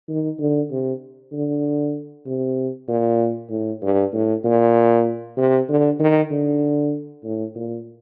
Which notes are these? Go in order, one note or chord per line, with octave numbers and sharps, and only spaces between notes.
D#3
D3
C3
D3
C3
A#2
A2
G2
A2
A#2
C3
D3
D#3
D3
A2
A#2